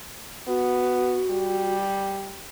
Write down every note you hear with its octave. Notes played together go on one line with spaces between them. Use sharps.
B3 F#4
G3